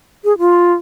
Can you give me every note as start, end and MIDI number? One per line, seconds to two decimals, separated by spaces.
0.24 0.37 68
0.39 0.74 65